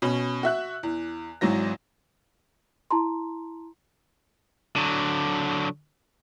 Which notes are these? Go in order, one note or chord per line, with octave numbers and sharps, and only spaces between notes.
B2 C#4 B5
F#4 E5 F#6
E2
G#1 G#2 E3 F#3 A#6
E4 A5 A#5 C6
D3 F#3